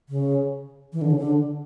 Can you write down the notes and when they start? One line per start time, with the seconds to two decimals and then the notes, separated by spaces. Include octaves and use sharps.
0.09 C#3
0.93 E3
1.01 D3
1.10 C#3
1.18 D3